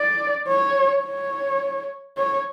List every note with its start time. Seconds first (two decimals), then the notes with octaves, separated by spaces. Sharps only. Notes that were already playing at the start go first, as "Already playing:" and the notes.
Already playing: D5
0.48 C#5
1.04 C#5
2.17 C#5